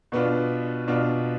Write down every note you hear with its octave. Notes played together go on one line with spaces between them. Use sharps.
B2 B3 D4 F4
B2 B3 D4 F4